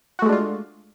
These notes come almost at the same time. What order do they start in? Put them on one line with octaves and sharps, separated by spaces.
F#4 A3 G#3 D4 F4